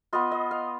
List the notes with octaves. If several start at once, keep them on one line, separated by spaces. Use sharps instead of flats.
B3 F4 D#5
D#5
F5